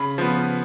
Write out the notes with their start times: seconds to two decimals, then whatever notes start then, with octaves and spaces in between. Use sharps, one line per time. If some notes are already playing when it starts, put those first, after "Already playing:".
Already playing: C#3 B5
0.18 F3 B3